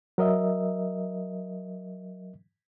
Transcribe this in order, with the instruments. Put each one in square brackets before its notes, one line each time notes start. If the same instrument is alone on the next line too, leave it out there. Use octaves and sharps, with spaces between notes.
[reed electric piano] F#3 A#4 D#5 E5